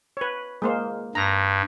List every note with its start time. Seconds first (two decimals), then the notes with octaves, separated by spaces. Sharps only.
0.17 B4 C#5
0.62 G#3 A#3 C5
1.15 G2 A#5